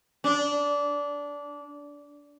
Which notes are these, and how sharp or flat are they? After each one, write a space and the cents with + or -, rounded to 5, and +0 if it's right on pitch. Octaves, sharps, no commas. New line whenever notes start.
D4 -20